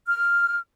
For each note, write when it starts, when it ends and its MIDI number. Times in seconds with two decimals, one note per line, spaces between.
0.06 0.57 89